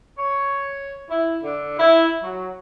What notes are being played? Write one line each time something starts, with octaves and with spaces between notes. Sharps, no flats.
C#5
E4
D3
E4
F#3